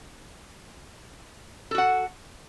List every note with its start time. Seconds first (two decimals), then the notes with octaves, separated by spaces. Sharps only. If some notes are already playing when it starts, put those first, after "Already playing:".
1.71 A4
1.75 F#4
1.78 F#5